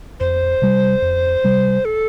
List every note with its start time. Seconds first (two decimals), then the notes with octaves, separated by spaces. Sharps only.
0.20 F2 C5
0.62 C3 G3
1.02 F2
1.44 C3 G3
1.85 A4